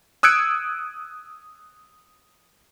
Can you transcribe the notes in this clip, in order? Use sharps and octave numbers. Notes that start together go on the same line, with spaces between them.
D#6 E6 F#6 G#6 C#7 D7